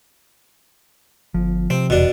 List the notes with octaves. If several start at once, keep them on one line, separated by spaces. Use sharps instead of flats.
G1 F3
C3 C4
F1 E2 B2 D4